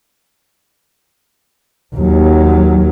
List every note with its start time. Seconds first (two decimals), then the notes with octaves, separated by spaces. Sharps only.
1.96 D#2 F#3